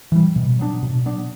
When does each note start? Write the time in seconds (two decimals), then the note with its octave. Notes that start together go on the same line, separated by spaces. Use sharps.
0.12 E3 G3
0.36 B2
0.59 F#3 B3 D4
0.83 B2
1.06 F#3 B3 D4